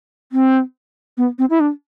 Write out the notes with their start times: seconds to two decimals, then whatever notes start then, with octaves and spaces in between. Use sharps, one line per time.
0.32 C4
1.17 B3
1.39 C4
1.50 E4
1.60 D4